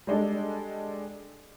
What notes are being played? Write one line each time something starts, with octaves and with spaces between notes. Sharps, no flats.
G3 G#3 D4 A4